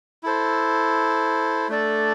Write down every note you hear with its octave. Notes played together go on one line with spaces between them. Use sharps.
E4 A4 C5
A3 D4 A4 D5